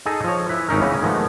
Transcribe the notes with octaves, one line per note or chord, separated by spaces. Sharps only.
D#4 G#4 A4 D#5
F3 C#5
E4 B4
G#1 C#4 D#4 A#4
C#3 E3 A#3 B3 C#4
D#3 F3 G#3 A3 B3